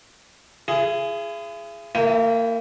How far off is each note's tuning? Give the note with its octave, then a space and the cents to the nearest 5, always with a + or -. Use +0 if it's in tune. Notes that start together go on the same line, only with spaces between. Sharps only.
E4 +45 G#4 +0
A#3 -25 E4 +15 G5 +0